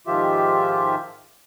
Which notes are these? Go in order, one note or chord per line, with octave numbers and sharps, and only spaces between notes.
G#2 D#3 F3 F4 G4 E5